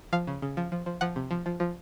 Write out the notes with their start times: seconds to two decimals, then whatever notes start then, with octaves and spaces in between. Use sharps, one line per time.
0.13 F3 F5
0.27 C#3
0.42 C#3
0.57 F3
0.72 F3
0.86 F3
1.01 F3 F#5
1.16 C3
1.31 F3
1.46 F3
1.60 F3